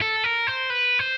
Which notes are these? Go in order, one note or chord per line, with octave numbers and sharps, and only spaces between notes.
A4
A#4
C5
B4
C5